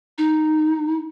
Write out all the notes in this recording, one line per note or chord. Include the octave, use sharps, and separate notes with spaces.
D#4